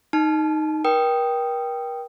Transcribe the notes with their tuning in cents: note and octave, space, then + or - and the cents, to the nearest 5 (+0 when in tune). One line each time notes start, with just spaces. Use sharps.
D#4 +0 A5 -30
A#4 +40 G5 +0 D#6 +0